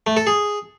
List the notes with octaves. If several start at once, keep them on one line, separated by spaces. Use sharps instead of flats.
A3
A4
G#4